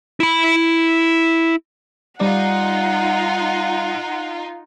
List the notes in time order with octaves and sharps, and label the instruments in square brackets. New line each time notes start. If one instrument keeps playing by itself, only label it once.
[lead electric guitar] E4 B5
[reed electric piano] G3 D5 [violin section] D#4 F4 [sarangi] F#5